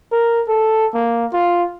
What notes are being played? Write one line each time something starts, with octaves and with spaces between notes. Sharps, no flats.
A#4
A4
A#3
F4